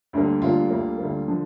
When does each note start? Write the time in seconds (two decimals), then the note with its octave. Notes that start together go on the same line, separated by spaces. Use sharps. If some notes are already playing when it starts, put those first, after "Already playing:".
0.13 D2 D3 G3 A#3
0.41 D2 D3 G3 A#3 F4
0.70 D2 D3 G3 A#3
0.98 D2 D3 G3 A#3
1.28 D3 F3